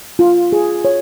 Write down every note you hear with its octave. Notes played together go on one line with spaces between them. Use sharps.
F4
G#4
C#5